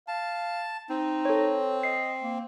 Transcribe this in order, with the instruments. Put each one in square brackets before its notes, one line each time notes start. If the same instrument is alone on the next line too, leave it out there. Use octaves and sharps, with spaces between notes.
[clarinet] F5 [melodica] A5
[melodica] C4 [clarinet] D#4
[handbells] A4 C#5
[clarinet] D#5 [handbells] C7
[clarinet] A#3